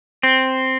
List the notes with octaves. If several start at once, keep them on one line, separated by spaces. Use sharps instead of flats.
C4